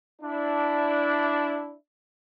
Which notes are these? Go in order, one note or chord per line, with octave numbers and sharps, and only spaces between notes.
D4 E4